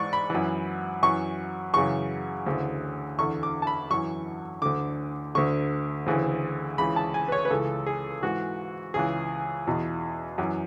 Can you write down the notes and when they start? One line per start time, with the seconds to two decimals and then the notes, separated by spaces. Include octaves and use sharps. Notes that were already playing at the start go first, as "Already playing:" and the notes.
Already playing: G#2 E3 D5 C#6
0.13 B5
0.30 F#2 E3
1.03 F#2 E3 C#6
1.74 F#2 C#3 E3 C#6
2.46 D2 C#3 E3
3.19 E2 D3 C#6
3.43 D6
3.62 A5
3.67 B5
3.90 F#2 E3 C#6
4.62 D2 D3 D6
5.35 D2 D3 C#6
6.06 D2 C#3 E3
6.78 C#2 C#3 E3 B5
6.96 A5
7.14 G#5
7.28 B4
7.32 C#5
7.45 B4
7.50 C#2 C#3 E3 A4
7.86 G#4
8.23 G#2 E3 F#4
8.94 C#2 C#3 E3 G#4
9.67 E2 B2
10.38 F#2 E3